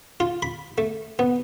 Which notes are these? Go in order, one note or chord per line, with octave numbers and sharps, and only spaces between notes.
F4
B5
A3
B3